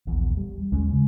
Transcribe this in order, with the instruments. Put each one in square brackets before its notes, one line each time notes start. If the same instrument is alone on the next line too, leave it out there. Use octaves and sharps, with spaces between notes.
[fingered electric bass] D#1 A#1 E2
G3
D#2 G#3 C#4
C#3 G#3